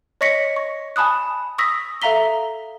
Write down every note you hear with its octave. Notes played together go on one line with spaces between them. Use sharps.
C#5 D#5 C#6 A#6 B6 C#7
C#6
G#5 A5 B5 D#6 F#6
C#6 D#6 E6 A#6 B6
A4 E5 F5 A#5 B6 G7